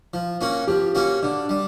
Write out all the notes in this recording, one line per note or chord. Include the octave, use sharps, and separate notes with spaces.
F3
A#3 C#4 F#4
F3 G4
A#3 C#4 F#4
D3
G3